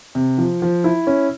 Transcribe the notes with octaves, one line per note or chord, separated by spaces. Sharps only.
C3
F3
F3
E4
C#4